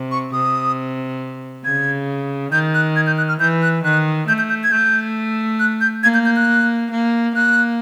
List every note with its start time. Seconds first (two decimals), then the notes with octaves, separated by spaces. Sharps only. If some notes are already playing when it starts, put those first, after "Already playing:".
Already playing: C3
0.11 C#6
0.33 C3 D#6
1.65 C#3 G#6
2.52 D#3 G6
2.74 F#6
2.96 G#6
3.07 G6
3.18 F#6
3.29 F6
3.40 E3 G6
3.62 F#6
3.84 D#3 F#6
4.28 A3 G6
4.38 G6
4.50 G6
4.64 G#6
4.72 A3 G6
5.60 F#6
5.81 G6
6.03 A#3 G#6
6.14 G6
6.26 G6
6.36 F#6
6.91 A#3
7.35 A#3 F#6